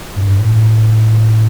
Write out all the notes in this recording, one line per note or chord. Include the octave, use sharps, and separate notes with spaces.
G2
A2